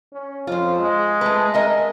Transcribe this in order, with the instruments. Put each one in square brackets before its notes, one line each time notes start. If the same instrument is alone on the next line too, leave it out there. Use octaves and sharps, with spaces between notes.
[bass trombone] C#4
[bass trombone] F2 [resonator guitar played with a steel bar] F4 C5
[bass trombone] G#3
[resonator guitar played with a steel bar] A3 B4
A#4 D#5 E5